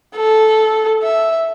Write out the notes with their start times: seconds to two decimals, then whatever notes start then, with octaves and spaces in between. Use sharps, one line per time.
0.15 A4
1.03 E5